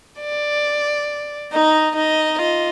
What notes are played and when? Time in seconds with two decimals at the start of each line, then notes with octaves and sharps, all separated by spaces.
0.21 D5
1.52 D#4 D#5
1.96 D#4 D#5
2.39 F4 D#5